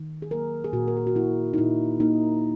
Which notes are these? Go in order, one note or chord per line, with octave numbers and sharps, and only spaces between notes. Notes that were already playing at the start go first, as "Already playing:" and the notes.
Already playing: D#3
G#4
F#3 A#3 A#4
G#4
A#2 F#4
A#4
G#4
F#4
A#3 E4
D#4
A#2 E4
A#3 D#4